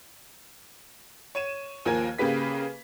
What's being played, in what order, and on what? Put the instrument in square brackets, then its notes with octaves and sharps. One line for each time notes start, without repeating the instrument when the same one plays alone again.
[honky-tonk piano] C#5 D#7 E7
D#2 F3 A#4 G#5 G#6
C#3 A#3 G4 B4 B6